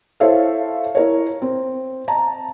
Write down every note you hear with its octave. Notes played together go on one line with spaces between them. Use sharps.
E4 A4 C5 C#5 E5 F5
E4 A#4 C#5
C4
A5 A#5